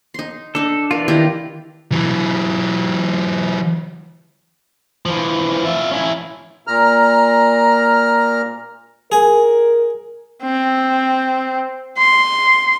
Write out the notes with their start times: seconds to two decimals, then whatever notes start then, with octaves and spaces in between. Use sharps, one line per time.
0.14 D#4 C6
0.55 D4 D#4 A4
0.91 E3 D4 F4 A#4
1.08 D#3 E4 G4
1.92 E3 F#3
5.06 E3 F3
5.65 F4 E5
5.91 C#4 E4
6.67 A#2 A#5 F6
9.12 G#4 A#4 G#5
10.44 C4
11.98 C6